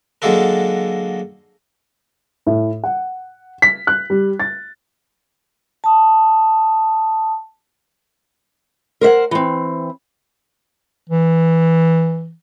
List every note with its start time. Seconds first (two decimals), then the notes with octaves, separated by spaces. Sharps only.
0.22 D3 F#3 G#3 A#3 A4 A#4
2.47 A2
2.84 F#5
3.62 B6
3.87 F#6
4.10 G3
4.40 A6
5.84 A5 D#6
9.01 A#4 C5 E5 F#5
9.31 E3 C4
11.10 E3